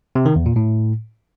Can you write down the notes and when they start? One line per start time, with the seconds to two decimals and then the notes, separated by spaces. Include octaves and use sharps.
0.15 C3
0.26 D#3
0.36 E2
0.46 A#2
0.56 A2